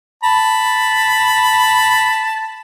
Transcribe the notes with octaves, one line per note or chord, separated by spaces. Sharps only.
A5 B5